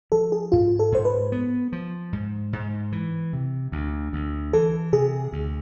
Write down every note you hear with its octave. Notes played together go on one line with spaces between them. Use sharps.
F3 A4
G#4
G#2 F4
A4
G#2 C5
B4
B3
F3
G#2
G#2
E3
C3
D2
D2
E3 A4
C3 G#4
D2